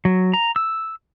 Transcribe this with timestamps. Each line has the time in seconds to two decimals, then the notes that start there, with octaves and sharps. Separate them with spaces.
0.05 F#3
0.34 A#5
0.56 E6